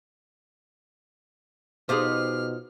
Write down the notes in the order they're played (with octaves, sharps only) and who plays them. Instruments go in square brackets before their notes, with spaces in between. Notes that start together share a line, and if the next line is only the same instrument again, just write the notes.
[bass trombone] B2 [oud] D#4 F4 C5 [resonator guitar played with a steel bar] G4 G#4 [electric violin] F6